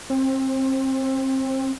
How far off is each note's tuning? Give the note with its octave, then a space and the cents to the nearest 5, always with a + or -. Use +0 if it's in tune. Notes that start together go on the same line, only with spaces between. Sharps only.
C4 +25